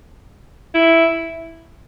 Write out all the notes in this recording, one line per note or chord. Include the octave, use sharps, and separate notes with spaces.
E4